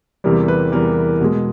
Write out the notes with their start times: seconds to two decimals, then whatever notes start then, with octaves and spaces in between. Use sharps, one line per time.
0.24 E2 C3 E3 G3 A#4
0.48 B4
0.72 E2 C3 E3 G3 A#4
1.21 B2 G#3